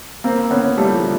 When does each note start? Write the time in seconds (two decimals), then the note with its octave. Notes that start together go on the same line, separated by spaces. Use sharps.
0.24 A#3 C4
0.51 B3 C#4
0.77 G3 A3
0.95 F3 G3